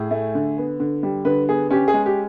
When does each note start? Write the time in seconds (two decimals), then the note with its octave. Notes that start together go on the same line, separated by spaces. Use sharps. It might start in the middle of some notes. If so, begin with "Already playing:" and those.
Already playing: A2 G#4
0.11 A3
0.35 D3
0.58 B3
0.80 D3
1.03 G3
1.25 D3 B4
1.49 B3 G#4
1.70 C#4 G4
1.88 G#4
1.94 G#3
2.06 G4